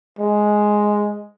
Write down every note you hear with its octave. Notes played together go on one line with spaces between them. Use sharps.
G#3